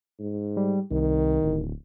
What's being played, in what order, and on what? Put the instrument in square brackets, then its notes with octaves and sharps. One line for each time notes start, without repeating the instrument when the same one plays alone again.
[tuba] G#2
[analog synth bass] G3
[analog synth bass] C2 [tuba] D#3
[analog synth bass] D1